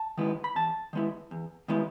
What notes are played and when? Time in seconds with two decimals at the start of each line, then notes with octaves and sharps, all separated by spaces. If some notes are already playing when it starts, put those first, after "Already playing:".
Already playing: A5
0.18 D#3 G#3 B3 E4
0.44 B5
0.56 E2 A5
0.93 D#3 G#3 B3 E4
1.31 E2
1.68 D#3 G#3 B3 E4